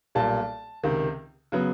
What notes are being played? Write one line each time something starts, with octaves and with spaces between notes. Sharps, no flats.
B1 A#2 G3 A5
C#2 C3 D#3
C#3 F#3 B3